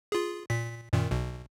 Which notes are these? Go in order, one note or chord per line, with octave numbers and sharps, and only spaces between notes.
F4 G#4
A#2 B6
F#2 A#2 D#3
B1 B2